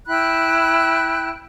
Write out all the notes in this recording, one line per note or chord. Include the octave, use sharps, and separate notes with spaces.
E4 G5 B5 F#6